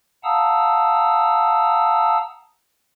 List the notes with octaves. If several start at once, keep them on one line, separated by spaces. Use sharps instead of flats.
F5 F#5 A5 A#5 D#6 E6